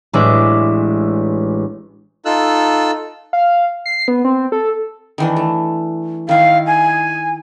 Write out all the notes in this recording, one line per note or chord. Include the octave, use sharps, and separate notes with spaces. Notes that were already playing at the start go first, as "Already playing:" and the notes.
A1 G#3 D4 E5
D#4 F4 A4 E6 F#6
F5
C7
B3
C4
A4
D#3 E3 D4
A3
D#3 E4 F5
G#5